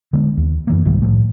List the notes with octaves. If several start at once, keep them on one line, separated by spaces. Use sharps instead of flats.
D3 G#3 B3
D#2
F#2 E3 A#3
C2 G#2 D#3 G3
A2 F3 A3